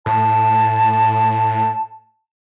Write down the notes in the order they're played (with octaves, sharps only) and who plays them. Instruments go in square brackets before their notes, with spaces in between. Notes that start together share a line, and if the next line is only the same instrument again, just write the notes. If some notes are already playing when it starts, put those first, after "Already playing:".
[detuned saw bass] A2 [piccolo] A5